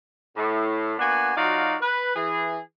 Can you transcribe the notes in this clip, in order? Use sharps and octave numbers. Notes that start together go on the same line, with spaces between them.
A2
A#3 B3 D4 F#4 G#5
F#3 D#4 F4 F#4 D5 F5
B4
E3 G#4